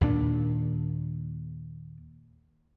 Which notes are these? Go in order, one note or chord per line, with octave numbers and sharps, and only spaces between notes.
D#2 A#2 D4